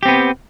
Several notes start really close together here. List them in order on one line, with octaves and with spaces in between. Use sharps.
G4 C4 B3